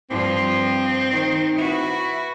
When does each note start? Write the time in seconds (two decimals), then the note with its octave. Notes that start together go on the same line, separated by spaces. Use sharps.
0.10 G2 F3 C4
1.11 D#3
1.59 E4 F#4 B4